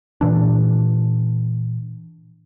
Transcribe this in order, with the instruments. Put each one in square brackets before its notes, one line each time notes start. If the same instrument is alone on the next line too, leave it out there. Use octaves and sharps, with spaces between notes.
[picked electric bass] A#2 E3 D4